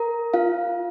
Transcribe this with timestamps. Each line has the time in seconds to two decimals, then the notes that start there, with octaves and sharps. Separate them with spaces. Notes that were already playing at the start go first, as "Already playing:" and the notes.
Already playing: A#4 A#5
0.34 F4 F5